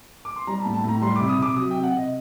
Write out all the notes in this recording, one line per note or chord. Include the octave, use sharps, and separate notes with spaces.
D6
C6
G3 A#5
A5
A2
A5
A2 A#5
G3 C6
C3 D6
D#6
C3 D6
F#3 D#6
C3 G5
F#5
C3 D#5